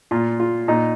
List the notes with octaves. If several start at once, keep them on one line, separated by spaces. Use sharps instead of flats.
A#2 F4
F4
A#2 D#4